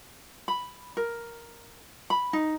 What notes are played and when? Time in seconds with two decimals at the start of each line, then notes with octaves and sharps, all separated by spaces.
0.48 B5
0.97 A#4
2.10 B5
2.33 D#4